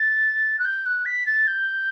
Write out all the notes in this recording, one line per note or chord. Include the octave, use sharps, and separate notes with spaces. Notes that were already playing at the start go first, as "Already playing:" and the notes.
Already playing: A6
F#6
G6
F#6
B6
A6
G6